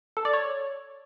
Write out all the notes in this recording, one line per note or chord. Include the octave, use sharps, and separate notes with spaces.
A4
D5
C#5